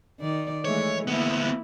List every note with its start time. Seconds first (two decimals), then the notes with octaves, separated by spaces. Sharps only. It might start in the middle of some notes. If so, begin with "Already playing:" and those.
0.20 D#3 D5
0.65 E3 G#3 A3 C#5
1.07 D2 A#3 B3 E4